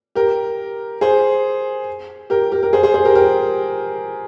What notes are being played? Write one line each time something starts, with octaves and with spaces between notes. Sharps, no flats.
G4 A#4
G#4 C5
G4 A#4
G4 A#4
A#4
G#4 C5
G#4 C5
G#4 C5
G4 A#4
G4 A#4